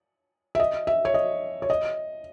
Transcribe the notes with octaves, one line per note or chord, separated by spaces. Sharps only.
E5
D#5
E5
C#5
D#5
C#5
D#5